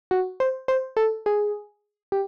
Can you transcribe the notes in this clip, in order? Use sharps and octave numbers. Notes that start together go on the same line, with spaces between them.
F#4
C5
C5
A4
G#4
G4